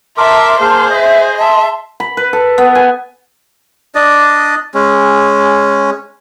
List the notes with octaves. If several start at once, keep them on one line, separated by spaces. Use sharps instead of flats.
A#4 E5 A5 C6 D6
A#3 G#4 C5 F5
D#5 E5
E5 A5 C6
B5
B4
A4
B3
G#5
D4 D5 D#5
G#3 C#4